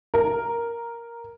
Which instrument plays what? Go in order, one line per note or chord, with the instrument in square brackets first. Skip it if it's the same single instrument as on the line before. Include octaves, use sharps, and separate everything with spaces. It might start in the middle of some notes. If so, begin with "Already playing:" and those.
[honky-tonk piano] A#4